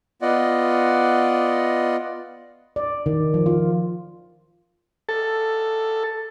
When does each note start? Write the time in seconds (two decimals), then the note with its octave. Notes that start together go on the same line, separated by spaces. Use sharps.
0.22 B3 F4 D5 D#5 F#5
2.76 D5
3.06 D#3
3.34 F3
3.46 F4
5.09 A4